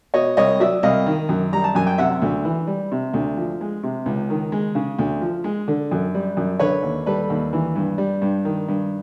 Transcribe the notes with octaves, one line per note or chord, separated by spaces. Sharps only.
B2 C#5 D#5
C2 C#5 D#5
F#3 D5 E5
C2 D#5 F5
D#3
F#2
G3 A#5
A5
F#2 G#5
G5
C3 E5 F#5
D2
E3
G3
C3
D2
F3
G#3
C3
C#2
D#3
G#3
C#3
D2
F3
G#3
D3
F#2
G3
F#2
D3 B4 C#5
D#2
G3 A4 B4
D#2
E3
G2
G3
G2
D#3
G2